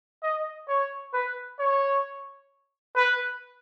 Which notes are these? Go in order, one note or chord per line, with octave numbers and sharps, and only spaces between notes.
D#5
C#5
B4
C#5
B4